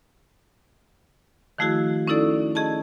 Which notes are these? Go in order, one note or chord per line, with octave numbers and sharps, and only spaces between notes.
D#3 F3 A3 E4 F#4 G#4
C#4 D#4 E4 A4 D5
C#4 G#4 D#5 A5